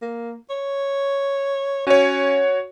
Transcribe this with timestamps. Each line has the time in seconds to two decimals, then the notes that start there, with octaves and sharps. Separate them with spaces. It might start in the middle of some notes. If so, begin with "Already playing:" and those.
0.02 A#3
0.49 C#5
1.87 C#4 F#4 C#5